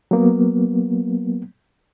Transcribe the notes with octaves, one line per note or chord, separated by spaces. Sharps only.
F#3 A#3 B3